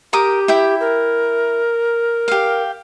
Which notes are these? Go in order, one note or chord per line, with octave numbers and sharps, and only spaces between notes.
G4 A#4 D6 D#6
E4 E5 G5
A#4
G4 F5